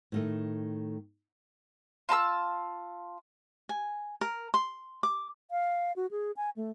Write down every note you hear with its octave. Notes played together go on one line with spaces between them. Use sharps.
A2 D#3 A3
F4 A5 A#5 E6
G#5
A#4
C6
D6
F5
F#4
G#4
G#5
A3